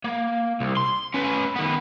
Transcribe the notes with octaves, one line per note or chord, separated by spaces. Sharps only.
A#3
C2
C6
C#4 B4
D#3 B3